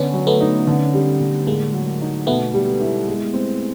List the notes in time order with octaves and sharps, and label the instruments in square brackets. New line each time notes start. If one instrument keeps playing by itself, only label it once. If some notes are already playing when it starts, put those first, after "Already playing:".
Already playing: [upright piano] D3 [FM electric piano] B3 C#4
[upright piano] F#3
[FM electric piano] A3 B3
[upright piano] D#4
D3
G3
D3
[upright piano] A2 [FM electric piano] G#3 A#3
[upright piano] F#3
D#4
[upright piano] B2 [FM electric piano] A3 B3
[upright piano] G3
E4
G#3
C4